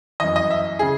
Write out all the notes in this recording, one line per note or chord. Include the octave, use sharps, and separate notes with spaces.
F#2 E3 D#5
D#5
E5
C#3 G#4